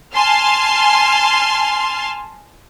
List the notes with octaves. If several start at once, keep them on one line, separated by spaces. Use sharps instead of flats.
G#5 A5 C6 F6